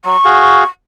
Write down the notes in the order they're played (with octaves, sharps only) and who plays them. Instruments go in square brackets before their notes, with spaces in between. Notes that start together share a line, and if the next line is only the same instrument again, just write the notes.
[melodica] F#3 [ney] C#6
[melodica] F#4 G#4 F5